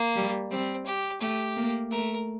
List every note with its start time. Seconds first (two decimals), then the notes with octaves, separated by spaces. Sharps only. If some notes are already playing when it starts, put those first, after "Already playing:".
Already playing: A#3
0.16 G3
0.51 G3 C4
0.86 G4
1.21 A3 G4
1.57 A#3
1.91 A3 A#4